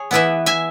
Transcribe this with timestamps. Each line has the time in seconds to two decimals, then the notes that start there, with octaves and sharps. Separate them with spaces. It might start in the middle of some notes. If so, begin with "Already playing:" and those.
Already playing: G#4 C#5
0.11 E3 B3 E4 B4 E5
0.46 E5 G#5